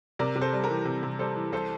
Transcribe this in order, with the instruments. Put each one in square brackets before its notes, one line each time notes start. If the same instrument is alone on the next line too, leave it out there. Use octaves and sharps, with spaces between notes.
[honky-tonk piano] C3 [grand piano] A#4 D5
[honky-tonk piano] C3
[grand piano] A4 C5
[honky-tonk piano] G3
[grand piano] G4 A#4
[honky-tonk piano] E3
C3
C3
[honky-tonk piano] G3 [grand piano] A4 C5
[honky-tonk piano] E3
[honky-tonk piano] C2 [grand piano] A4 C5